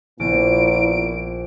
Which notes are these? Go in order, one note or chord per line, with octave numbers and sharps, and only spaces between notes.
A#1 A#2 B3 E4 D7